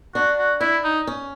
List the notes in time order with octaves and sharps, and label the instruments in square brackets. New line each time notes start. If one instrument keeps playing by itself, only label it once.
[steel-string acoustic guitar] D4 [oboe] F#4
[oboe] F#4
[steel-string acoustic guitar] D4 [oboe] E4
[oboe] D#4
[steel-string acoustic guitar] C#4